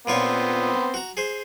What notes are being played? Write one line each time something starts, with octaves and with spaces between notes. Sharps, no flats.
A#2 B3 C4 F4 C#5
F#4 A#5
G#4 C5